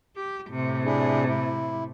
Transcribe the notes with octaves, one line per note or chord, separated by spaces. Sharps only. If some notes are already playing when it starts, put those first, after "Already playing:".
G4
A2 C3
D4 E4 G#4
E4